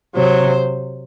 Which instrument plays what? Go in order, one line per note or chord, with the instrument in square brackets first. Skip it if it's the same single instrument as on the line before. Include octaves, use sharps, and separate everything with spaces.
[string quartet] C3 F#3 C5